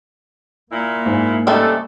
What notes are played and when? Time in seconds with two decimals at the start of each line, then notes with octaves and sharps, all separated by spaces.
0.72 A#2 A#3 E4
1.06 G#2
1.47 C#3 G3 A3 C4 D#4 A4